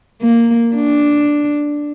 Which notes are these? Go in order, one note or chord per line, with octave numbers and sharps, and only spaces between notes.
A#3
D4